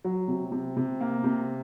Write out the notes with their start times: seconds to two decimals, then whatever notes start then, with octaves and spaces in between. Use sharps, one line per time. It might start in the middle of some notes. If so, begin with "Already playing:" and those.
0.04 F#3
0.28 C3
0.52 C3
0.77 C3
1.00 A#3
1.24 C3